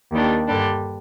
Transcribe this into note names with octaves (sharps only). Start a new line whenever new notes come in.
D#2 D#3 G3 D4
G2 D3 G3 D4